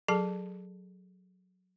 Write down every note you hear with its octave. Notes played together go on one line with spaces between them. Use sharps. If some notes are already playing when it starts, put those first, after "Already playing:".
F#3 G#4 A4 A5